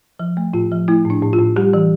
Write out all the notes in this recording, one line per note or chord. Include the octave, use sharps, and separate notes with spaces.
F3
A3
A2 F4
F3
A3 E4
A2
D4
A2
F4
A2
G3 G4
E3